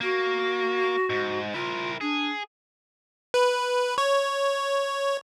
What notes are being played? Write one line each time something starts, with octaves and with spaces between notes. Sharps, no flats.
A#3 F#4
G#2
E4 F4 A#4
D4 G#4
B4
C#5